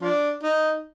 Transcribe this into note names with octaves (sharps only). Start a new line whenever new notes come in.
F3 D4
D#4